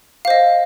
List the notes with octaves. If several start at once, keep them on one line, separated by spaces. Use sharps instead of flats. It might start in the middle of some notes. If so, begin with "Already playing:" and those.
C5 D#5 F5